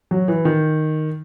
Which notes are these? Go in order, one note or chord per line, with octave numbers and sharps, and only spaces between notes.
F#3
E3
D#3